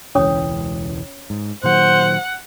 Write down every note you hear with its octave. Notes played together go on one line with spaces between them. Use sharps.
E1 C#2 E3 C#4 C#5 D#6
G#2
A#2 D#3 F#3 C5 F#5